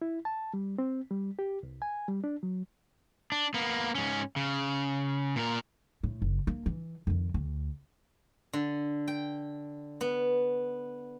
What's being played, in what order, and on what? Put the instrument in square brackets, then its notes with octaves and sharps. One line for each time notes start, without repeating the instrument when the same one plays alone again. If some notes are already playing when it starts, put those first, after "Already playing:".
[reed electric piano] E4
A5
G3
C4
G3
G4
C2
G#5
G3
D4
F#3
[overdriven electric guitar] D4
A#3 B3
G#2 C#4
C#3
A#2 A#4
[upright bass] A2
F#1
A#3
E3
F2 D#3
D2
[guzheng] D3
G5
B3